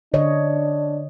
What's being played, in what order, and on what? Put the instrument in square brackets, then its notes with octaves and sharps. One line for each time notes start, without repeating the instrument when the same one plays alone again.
[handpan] D3 C#5 D#5 [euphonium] D4